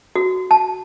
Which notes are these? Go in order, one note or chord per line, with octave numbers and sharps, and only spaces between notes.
F#4
A5